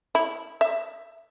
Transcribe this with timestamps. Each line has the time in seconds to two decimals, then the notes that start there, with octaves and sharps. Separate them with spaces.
0.15 E4
0.61 E5